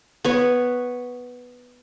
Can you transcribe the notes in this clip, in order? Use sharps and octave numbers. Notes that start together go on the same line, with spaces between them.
B3 C#5